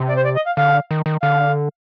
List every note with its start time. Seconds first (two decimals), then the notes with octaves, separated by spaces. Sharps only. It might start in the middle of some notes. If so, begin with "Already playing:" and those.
Already playing: C3
0.09 D5
0.16 C5
0.24 D5
0.36 D#5
0.46 F5
0.57 D3 F5
0.91 D#3
1.06 D#3
1.22 D3 F5